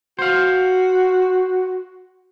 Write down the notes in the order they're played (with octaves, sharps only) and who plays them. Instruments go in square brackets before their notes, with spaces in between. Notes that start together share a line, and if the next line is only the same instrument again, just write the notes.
[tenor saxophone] F#4 [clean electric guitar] C5 F5